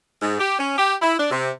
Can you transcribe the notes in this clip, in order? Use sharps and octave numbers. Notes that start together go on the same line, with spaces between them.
G#2
G4
C#4
G4
E4
D4
C3